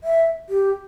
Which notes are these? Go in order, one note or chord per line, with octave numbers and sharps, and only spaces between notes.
E5
G4